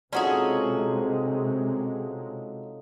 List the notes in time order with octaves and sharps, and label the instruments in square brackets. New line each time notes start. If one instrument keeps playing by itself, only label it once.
[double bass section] C3 G#3 [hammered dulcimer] F3 D#4 A4 [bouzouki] C#4 F#4 G#4